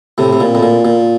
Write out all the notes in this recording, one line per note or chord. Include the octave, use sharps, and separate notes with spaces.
A2 C3
C3
A#2
A2
A#2
A#2